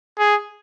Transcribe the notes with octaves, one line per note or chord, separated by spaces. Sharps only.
G#4